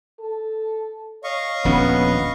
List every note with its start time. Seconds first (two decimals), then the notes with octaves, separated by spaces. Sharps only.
0.20 A4
1.24 C#5 D#5 F5 C#6
1.65 D#1 A#1 B3 C#4